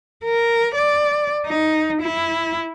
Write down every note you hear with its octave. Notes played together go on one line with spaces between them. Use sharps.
A#4
D5
D#4
E4